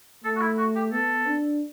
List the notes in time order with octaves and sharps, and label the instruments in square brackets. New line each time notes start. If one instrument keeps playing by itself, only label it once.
[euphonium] A3 [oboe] A4
[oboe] F#4
E4
F#4
G4
[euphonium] B3 [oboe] A4
[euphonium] D4